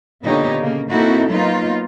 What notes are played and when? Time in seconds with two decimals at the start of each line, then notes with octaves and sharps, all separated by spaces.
0.23 A#2 D3 B3 D#4 G4 C#5
0.60 C#3 A#3
0.90 A#3 C4 D#4 E4 F#4 A4
1.29 F#3 A#3 B3 D#4 F4